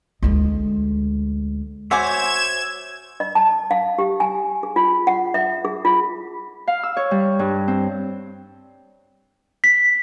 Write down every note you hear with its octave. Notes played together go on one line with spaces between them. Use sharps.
D2 G#3
F#4 C5 C#5 E5 G#5 D6 G#6 E7
D#5
A5
F5
G4
G#5
G#4
F4
F#5
E5
G#4
F4
F5
E6
C#5
G3
G2
C4
B6